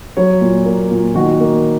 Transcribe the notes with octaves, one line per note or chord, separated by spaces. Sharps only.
F#3 C#5
A#2
A#3
A#2
D#3 F#4
A#3